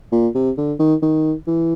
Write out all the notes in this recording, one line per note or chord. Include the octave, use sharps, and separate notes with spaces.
A#2
C3
D3
D#3
D#3
E3